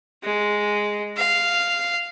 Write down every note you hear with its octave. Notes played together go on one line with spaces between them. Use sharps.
G#3
F5